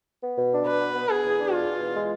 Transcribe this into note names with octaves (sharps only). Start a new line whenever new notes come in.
B3
B2
D4
B2 B4
B3
B3
B3 G#4
E2
D4
B2 F4
B2
E2
G#3